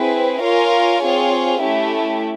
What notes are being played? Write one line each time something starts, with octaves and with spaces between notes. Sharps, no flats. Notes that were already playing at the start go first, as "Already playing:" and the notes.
Already playing: C4 E4 G#4 B4
F4 A#4 C#5 F5 G#5
C4 F4 G#4 C#5
A3 C#4 E4 G4